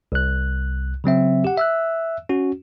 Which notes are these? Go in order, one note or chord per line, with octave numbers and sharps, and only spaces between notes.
C2 F#6
C#3 F#3 C4 E5
G4 F#5
E5 E6 F#6
C#4 F#4